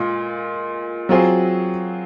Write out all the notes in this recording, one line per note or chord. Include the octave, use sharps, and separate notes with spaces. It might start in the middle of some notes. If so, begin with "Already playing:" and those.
Already playing: A#2 G#3 F4
F#3 C4 F4 G#4